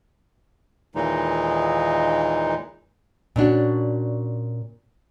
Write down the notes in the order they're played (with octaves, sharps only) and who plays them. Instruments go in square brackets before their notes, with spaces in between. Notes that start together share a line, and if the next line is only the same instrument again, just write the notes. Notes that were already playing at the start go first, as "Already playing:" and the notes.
[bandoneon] D#2 A#2 E3 G#3 D#4
[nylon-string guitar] A#2 C#4 D4 F#4